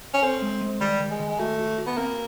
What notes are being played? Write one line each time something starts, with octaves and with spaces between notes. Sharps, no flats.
C#4
C4 A4
G#3
G#3
D#3 G3
D#3
G#3
D#3
G#3
A3 F#4
F#4
F#4
B3
A#3 C4